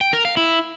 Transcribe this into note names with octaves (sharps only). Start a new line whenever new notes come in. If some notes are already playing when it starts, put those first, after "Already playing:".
G5
A#4
F5
E4